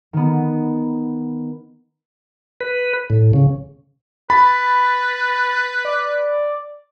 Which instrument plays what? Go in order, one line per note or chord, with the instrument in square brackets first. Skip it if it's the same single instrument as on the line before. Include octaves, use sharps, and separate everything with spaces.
[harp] D#3 B3
[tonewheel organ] B4
A2
C#3
[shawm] B4 [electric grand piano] B5 [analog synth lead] A6
[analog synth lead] D5